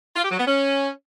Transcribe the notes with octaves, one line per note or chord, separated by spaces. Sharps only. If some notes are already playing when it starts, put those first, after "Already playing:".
F4
G4
F#3
B3
C#4